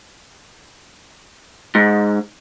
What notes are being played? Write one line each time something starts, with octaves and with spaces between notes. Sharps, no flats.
G#2